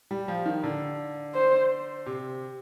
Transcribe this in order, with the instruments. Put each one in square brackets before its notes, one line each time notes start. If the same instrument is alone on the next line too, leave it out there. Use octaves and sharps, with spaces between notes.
[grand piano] G3
F3
D#3
D3
[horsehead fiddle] C5
[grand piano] C3